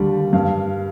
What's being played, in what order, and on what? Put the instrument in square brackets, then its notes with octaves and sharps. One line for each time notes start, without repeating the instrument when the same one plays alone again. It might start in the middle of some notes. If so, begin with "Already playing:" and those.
Already playing: [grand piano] D#2 D3 G3
G2 F5